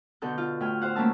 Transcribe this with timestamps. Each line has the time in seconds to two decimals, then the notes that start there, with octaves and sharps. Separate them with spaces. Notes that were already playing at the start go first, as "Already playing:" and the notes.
0.22 B2 D3 A4 G6
0.38 F4
0.60 A2 G5 G#5 F6
0.81 C5 F5 F#5
0.95 A3 A#3 C#4 A5 E6